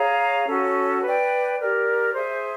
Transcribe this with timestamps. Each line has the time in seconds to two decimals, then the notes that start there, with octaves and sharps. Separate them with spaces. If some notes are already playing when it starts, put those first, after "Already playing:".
Already playing: G#4 C#5 F5 A#5
0.46 C#4 F#4 A4
1.02 B4 D5 G5
1.58 G4 A#4 D5
2.14 G#4 C5 E5